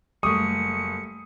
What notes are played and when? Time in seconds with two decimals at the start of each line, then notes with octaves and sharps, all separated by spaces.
0.23 F#1 G3 A3 C#6 D#6 C#7